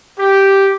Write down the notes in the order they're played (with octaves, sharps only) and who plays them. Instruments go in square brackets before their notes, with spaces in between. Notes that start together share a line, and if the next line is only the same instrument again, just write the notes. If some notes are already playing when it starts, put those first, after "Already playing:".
[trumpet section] G4